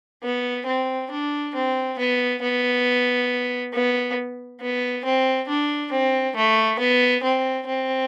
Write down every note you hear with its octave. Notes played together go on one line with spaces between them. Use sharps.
B3
C4
D4
C4
B3
B3
B3
B3
C4
D4
C4
A3
B3
C4
C4